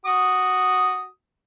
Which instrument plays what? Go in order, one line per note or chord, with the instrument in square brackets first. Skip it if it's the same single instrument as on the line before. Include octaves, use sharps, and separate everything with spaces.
[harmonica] F#4 D#6